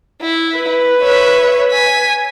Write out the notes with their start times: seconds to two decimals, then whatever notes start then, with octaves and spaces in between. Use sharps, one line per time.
0.22 E4
0.57 B4
1.01 C#5 E5
1.71 G#5 B6